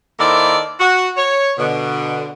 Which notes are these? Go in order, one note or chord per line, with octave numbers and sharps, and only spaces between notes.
D#3 A#3 E4 A4 C5 D5
F#4
C#5
B2 D3